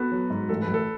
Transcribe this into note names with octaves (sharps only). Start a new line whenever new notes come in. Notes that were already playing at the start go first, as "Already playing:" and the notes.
Already playing: B3 F#4 A4 B4
F#3
G#2
A1 A4
B4
A1
A4